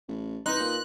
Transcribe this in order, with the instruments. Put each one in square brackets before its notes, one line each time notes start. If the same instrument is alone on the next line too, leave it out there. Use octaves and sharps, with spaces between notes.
[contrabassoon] A1
[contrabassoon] C2 [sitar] D#4 [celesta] B4 C6 [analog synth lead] F#6
[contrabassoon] A#2